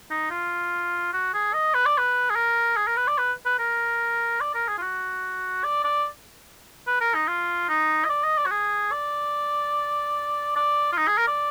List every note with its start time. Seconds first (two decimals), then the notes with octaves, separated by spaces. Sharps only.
0.10 D#4
0.30 F4
1.13 F#4
1.34 G#4
1.54 D#5
1.74 B4
1.86 D5
1.98 B4
2.30 G#4
2.36 A#4
2.77 G#4
2.87 A#4
2.97 B4
3.08 D5
3.18 B4
3.46 B4
3.59 A#4
4.41 D5
4.54 A#4
4.68 G#4
4.78 F4
4.82 F#4
5.64 D5
5.84 D5
6.87 B4
7.01 A#4
7.14 D#4
7.28 F4
7.69 D#4
8.05 D#5
8.09 D5
8.23 D#5
8.37 D5
8.46 F#4
8.51 G#4
8.92 D5
10.56 D5
10.93 F4
10.97 D#4
11.07 G#4
11.18 A#4
11.28 D5